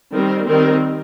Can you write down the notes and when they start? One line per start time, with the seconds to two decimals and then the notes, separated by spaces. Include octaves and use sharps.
0.13 D#3 G3 C4 A#4
0.46 D#3 G3 C4 A#4